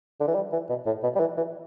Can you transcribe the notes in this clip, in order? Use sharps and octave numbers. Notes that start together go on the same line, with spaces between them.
D3
E3
G3
E3
B2
A2
B2
G3
E3
E3